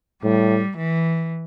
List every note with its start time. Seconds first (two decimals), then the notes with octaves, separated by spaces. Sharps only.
0.23 A2 G3
0.78 E3